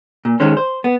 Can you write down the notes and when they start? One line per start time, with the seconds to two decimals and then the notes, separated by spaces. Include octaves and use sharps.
0.25 A#2
0.40 D#3 G#3 C#4 C5
0.57 C5
0.84 B3